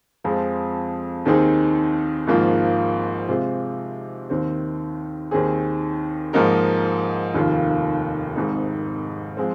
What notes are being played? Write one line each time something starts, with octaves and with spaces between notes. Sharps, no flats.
F2 F3 G#3 C4
D#2 D#3 C4 D#4 G#4
G#1 G#2 F3 A#3 F4
C3 G#3 F4 C5
D#2 D#3 C4
D#2 D#3 C4 G#4
G#2 F3 A#3 D#4 A#4
F1 D#2 D#3 A#3 F4
G#1 G#2 D#3 C4 D#4
F3 G#3 C4